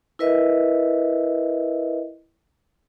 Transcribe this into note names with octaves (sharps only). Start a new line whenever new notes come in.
E4 A#4 B4 D#5 E5